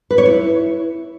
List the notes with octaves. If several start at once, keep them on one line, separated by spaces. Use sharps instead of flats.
B4
C#5
E4